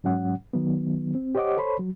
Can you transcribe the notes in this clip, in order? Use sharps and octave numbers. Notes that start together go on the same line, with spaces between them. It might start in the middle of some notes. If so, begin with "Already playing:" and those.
G#2 F#3 C#4 F#5
D#3 F#3 B3
C4
G4 C5 C#5 D#5 F#5 D6
A4 C5 C#5 B5 C6
F#3